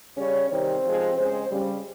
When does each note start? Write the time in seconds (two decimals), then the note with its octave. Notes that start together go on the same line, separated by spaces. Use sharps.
0.17 C#3 G3 C#4 C#5
0.50 C3 D#3 G3 C4 C5
0.84 C3 F3 G#3
1.17 C#3 G#3 C4 C5
1.51 C#3 G3